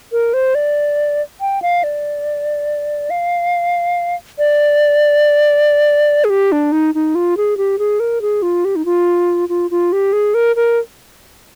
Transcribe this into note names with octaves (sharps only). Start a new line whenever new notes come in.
A#4
C5
D5
G5
F5
D5
F5
D5
G#4
G4
D4
D#4
D#4
F4
G#4
G4
G#4
A#4
G#4
F4
G4
D#4
F4
F4
F4
G4
G#4
A#4
A#4